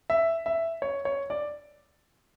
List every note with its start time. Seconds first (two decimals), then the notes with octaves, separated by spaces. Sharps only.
0.10 E5
0.46 E5
0.82 C#5
1.05 C#5
1.30 D5